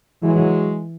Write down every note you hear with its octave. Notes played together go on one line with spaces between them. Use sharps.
E3 F#3 G#3